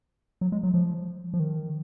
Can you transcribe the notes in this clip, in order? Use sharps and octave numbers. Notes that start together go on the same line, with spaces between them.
F#3
G#3
F#3
F3
F3
D#3